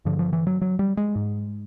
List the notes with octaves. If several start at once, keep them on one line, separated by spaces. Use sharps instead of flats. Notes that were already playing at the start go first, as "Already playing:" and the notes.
G2 D3 F3
F3
E3
F#3
F#3
G3
G#3
G#2